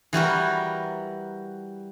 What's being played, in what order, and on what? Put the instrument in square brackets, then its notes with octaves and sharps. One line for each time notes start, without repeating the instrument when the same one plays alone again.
[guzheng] E3 G3 F#4 A#4